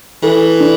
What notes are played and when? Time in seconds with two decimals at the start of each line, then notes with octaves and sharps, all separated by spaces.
0.23 E3 A4
0.60 D4